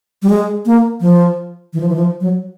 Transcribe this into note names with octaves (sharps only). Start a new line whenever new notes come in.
G3
G#3
A#3
F3
E3
F3
E3
F3
F#3